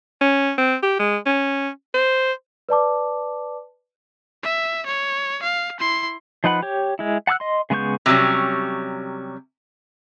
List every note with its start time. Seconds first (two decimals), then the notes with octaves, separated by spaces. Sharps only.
0.21 C#4
0.58 C4
0.82 G4
0.99 G#3
1.26 C#4
1.94 C5
2.69 B4 D5 A5 D6
4.43 E5
4.86 C#5
5.42 F5
5.79 E4 C6
6.44 F3 D#4 B4 F#5 B5
6.62 G4 C#5
6.99 G#3 E4
7.27 F#5 A5 D6 E6 F#6
7.40 D#5 C6
7.70 C#3 G#3 B3 C#6 G6
8.06 C3 F#3 G3 C#4